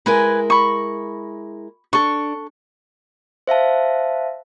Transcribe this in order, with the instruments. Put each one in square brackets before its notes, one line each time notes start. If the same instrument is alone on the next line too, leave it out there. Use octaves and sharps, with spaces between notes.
[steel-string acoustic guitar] G#3 E4 A#4 [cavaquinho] B4 G#5
[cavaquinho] B5 C#6
[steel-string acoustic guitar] D4 [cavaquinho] A4 C#6
[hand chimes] C5 E5 F5 A5